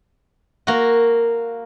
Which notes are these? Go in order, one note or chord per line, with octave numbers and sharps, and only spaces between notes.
A#3 F#4